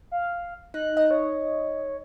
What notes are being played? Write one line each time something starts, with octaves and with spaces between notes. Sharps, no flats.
F5
D#4 F#6
D#5
C#5